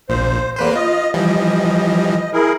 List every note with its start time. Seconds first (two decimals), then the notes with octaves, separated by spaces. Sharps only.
0.09 A#1 A#2 C5
0.56 E2 A#3 B4 C5
0.76 F4 D#5
1.14 E3 F3 G3 D#5
2.33 E4 G#4 A#4